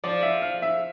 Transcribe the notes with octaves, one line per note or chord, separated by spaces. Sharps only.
F3 D5
E5
F5
E5